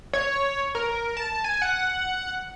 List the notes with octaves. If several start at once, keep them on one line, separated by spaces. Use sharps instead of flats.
C#5
A#4
A5
G#5
F#5